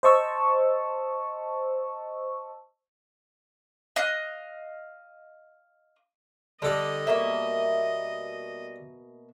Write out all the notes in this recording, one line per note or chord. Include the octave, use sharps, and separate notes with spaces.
C5 D#5 A5 C#6 E6
D#5 F5 F#6
D3 G3 A4 D5 D#5
B2 A#3 E5